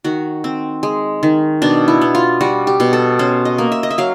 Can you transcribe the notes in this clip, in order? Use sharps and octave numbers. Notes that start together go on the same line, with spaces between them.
D#3 F#4
C4
G#3
D#3
B2 D4
E4
B3
F4
G3 F#4
G4
B2
A4
C#4 C5
D#5
A#3
E5
D#5
E5
F#3 F5